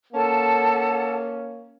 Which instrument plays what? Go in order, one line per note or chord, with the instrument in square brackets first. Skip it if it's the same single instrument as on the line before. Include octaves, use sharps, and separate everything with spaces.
[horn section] A#3 C#4 [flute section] A4 F#5 A5